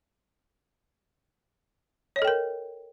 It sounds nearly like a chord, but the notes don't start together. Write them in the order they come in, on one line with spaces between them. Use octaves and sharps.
C#5 D#5 A4 G5 A#4